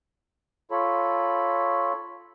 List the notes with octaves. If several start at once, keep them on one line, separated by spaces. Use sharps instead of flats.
F4 A4 C#5 B5